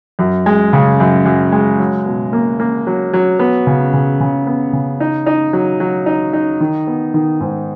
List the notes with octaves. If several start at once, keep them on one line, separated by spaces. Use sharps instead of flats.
F#2
G#3
C#3
F#2
F#2
G#3
F#3
B2
A#3
A#3
F#3
F#3
B3
C#3
C#3
C#3
B3
C#3
D#4
D#4
F#3
F#3
D#4
D#4
D#3
B3
D#3
G#2